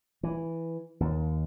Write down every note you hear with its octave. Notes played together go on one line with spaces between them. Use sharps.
E3
D#2